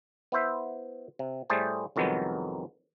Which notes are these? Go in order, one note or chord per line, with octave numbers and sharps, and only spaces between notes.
B3 E4 C5 E5
C3
A2 G3 A3 G#4 C5 A5
C2 F2 D#3 F#3 G#3 B3